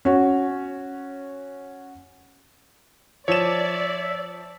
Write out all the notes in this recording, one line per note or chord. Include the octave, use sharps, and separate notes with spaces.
C#4 F#4
F3 C#5 D5 E5 E7